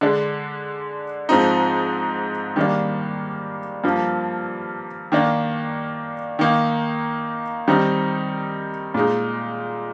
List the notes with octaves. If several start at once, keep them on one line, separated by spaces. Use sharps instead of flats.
D3 G#3 D4
G#2 F3 C4 D#4
D#3 G3 A#3 D4
G2 F3 A#3
D#3 A#3 D4
D#3 A#3 D#4
D#3 G3 C4 D#4
A#2 G#3 D#4